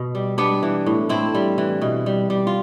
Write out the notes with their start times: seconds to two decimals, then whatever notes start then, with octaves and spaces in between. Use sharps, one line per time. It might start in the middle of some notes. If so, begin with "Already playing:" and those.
Already playing: B2
0.15 G3
0.38 G3 B3 D4
0.63 E3
0.86 A2
1.09 A2 C4 E4
1.35 G3
1.58 E3
1.81 B2
2.06 G3
2.30 G3
2.47 F4